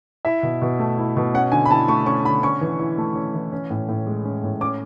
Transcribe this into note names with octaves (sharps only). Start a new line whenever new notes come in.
E4 E5
B2
B2
A3
E4
B2
C#4 F#5
D3 G#5
B5
E4 A5
A3 C#6
C#4 C#6
D3 B5
C#4 C#6
E3
E4
A3
C#4
E3
C#4
A2
A2
G#3
C#4
A2
C#4 D6